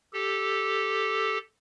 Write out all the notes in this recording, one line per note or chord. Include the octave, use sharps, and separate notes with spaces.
G4 A4